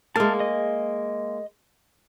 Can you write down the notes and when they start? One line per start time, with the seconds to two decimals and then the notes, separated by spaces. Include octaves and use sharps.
0.16 G#3 A#3 A5 F6
0.40 D#5